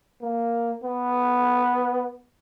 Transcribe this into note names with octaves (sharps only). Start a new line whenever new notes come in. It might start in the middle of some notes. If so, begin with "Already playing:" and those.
A#3
B3